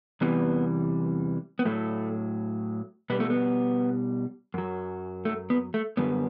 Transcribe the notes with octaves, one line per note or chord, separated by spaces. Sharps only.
E2 C3 E3 G3 B3
B3
A2 F#3 A3
B2 G3 B3
A3
B3
F#2 F#3
A3
B3
A3
F#2 D3 G3 B3